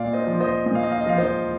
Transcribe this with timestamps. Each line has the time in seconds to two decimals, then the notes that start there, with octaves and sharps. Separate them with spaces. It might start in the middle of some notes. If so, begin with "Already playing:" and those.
Already playing: A#2 D5 F5
0.13 C5 D#5
0.27 F3
0.40 C5 D#5
0.66 A#2 D#5
0.75 F5
0.83 D#5
0.92 F5
1.01 D#5
1.06 F3 F5
1.18 C5 D#5